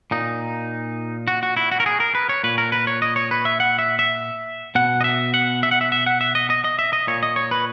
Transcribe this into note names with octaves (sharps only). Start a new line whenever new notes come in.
A#2 D#4
F#4
F#4
E4
F#4
A#4
G#4
A#4
B4
C#5
A#2 B4
A#4
B4
C#5
D#5
C#5
B4
E5
F#5
E5
E5
B2 F#5
D#5
E5
F#5
E5
F#5
E5
E5
F#5
E5
D#5
D#5
D#5
E5
D#5
A#2 C#5
D#5
C#5
B4